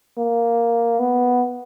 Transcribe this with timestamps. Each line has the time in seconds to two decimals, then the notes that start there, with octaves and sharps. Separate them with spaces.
0.18 A#3
0.99 B3